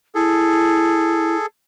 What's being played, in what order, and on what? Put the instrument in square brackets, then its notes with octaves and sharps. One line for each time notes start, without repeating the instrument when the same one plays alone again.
[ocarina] E4 [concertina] G#4 A4